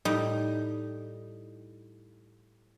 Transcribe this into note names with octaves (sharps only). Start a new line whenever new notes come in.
A2 G3 D#4